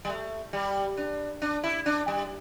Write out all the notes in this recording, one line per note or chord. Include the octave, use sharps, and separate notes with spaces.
G3
A3
G3
D4
D4
E4
D4
G3